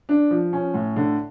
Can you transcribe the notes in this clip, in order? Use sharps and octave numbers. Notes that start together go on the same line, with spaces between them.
D4
F3
C#4
A2
D3